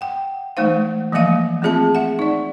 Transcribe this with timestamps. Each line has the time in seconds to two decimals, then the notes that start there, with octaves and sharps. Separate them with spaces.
0.01 F#5 G5
0.57 E3 G#3 A3 D#4 C5 F5
1.12 E3 F3 G#3 A#3 E5 F5
1.62 A3 C4 F4 G#4 E5 A5
1.95 E5 F#5
2.19 D#4 D5